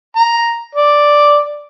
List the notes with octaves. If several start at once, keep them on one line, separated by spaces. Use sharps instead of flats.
A#5
D5